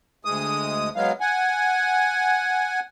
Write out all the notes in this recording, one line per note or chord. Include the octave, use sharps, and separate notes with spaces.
D2 G#3 D#6
F#3 G#3 B3 F5
F#5 G#5